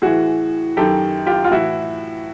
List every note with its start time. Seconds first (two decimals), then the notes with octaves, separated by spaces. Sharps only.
0.02 A2 E3 F#4 G#4
0.77 F#2 D#3 G4 A4
1.26 F4 G4
1.44 F4
1.51 A2 E3 E4 F#4